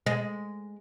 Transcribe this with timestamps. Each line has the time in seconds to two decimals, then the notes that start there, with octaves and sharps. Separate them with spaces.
0.06 G#3